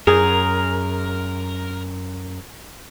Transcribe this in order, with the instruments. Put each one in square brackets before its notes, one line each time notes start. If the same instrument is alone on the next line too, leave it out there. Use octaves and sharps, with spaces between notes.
[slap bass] F#2 [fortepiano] G#4 [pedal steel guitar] A#4